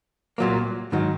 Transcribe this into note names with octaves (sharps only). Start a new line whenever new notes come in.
C2 A#2 F#3 A#3
G#2 D#3 F#3